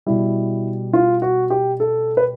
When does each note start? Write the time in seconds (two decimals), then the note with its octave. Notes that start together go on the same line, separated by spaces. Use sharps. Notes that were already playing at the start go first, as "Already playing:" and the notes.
0.06 B2 G3 E4
0.93 F4
1.22 F#4
1.50 G4
1.80 A4
2.17 B4